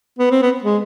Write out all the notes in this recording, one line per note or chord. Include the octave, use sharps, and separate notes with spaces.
B3
C4
B3
G#3